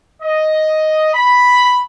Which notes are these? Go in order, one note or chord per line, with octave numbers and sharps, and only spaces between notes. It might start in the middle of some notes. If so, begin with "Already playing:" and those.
D#5
B5